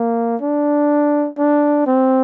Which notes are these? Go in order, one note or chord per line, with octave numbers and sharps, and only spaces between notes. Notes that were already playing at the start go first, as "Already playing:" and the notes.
Already playing: A#3
D4
D4
C4